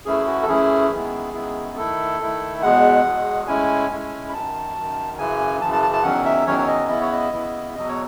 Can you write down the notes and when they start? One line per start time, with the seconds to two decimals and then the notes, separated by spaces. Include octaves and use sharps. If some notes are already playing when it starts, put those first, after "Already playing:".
0.05 F#2 E3 A3 C#4 E4 G#4
0.27 F#4
0.42 A4
0.48 F#2 E3 A3 C#4 E4 G#4
0.92 F#2 D#3 G#3 B3 E4
1.34 F#2 D#3 G#3 B3 E4
1.77 D#3 A3 E4 A4
2.20 D#3 A3 E4
2.62 E2 B2 G#3 F#5
3.05 E2 B2 G#3
3.47 A2 G#3 C#4 E4 G#5
3.90 A2 G#3 C#4 E4
4.29 B5
4.33 F#2 D#3 F#3 A5
4.75 F#2 D#3 F#3
5.18 F#2 C#3 E3 G#5
5.61 F#2 C#3 E3 A5
5.72 A5
5.83 A5
5.93 A5
6.03 E2 D#3 F#3 C#4 F#5
6.25 E5
6.47 E2 D#3 F#3 C#4 C#5
6.58 C#5
6.67 D#5
6.89 C#3 E3 B3 E4 D#5
7.01 C#5
7.12 D#5
7.32 C#3 E3 B3 E4
7.75 E2 B2 F#3 D#5
7.88 C#5